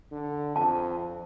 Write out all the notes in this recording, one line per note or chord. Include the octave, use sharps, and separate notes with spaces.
D3
F2 A5